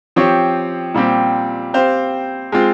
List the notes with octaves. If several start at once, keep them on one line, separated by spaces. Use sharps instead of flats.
F3 C4 G4 C#5
A#2 G3 C4 G4
C4 G4 C5 F5
G#3 C4 F4